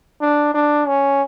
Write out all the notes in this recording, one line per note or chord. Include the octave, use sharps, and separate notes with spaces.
D4
D4
C#4